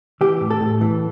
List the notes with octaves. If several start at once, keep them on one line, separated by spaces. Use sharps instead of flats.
E3 G4
A2
A4
A2
E3